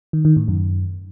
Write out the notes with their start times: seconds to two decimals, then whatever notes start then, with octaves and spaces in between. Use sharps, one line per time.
0.13 D#3
0.25 D#3
0.36 A2
0.48 F#2